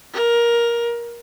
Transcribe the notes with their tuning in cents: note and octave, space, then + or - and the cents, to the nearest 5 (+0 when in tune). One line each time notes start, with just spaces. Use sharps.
A#4 +15